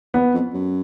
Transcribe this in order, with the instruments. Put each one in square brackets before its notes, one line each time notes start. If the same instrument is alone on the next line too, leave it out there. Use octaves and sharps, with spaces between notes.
[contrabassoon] E2 [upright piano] B3
[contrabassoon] F2
F#2